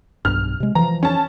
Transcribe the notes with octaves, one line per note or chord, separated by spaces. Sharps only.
B1 G2 F6
C3 G#3
E3 F3 A#5
C#4 A5